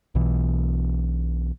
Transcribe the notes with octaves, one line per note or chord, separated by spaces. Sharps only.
B1 B2 E3